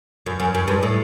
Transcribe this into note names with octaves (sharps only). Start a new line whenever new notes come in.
F#2
F#2
F#2
G2
A2